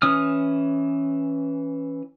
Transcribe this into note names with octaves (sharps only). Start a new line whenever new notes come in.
E3 C#4 D#6 F6